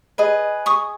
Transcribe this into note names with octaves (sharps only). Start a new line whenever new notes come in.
G#4 B4 D#5
C#6 D#6